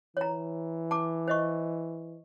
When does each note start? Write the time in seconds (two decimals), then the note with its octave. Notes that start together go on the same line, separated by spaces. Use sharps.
0.17 E3 C#5 A#5
0.91 A5 D6
1.28 C5 D#5 C#6